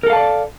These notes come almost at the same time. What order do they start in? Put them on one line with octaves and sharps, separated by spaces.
A#4 A4 F5 A5 D5